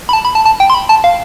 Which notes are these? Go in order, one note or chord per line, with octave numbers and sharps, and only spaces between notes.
B5
A5
B5
A5
A5
G5
C6
B5
A5
F5